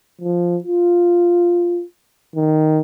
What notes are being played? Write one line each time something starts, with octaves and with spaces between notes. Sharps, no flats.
F3
F4
D#3